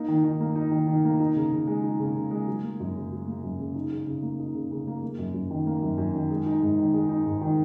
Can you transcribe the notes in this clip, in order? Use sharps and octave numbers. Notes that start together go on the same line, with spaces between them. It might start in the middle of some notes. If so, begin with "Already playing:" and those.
Already playing: A#3 D#4
D#3
D#3
A#3
D#4
D#3
D#3
A#3
D#4
C#3
C#3
G#3
D#4
C#3
C#3
G#3
F#3
A#3
F#2
C#3
F#3
A#3
F#2
C#3
D#4
C#3
C#3
A#3
D#4
C#3
C#3
A#3
A#3
F#2
F#2
D#3
A#3
F#2
F#2
D#3
G#3
D#4
G#2
D#3
G#3
D#4
G#2
D#3